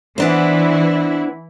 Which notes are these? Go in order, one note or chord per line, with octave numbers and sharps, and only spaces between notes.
E3 B3 D4 E4 C5